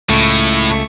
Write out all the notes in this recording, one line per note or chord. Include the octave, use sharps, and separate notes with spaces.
C#2 A2 A3 C#6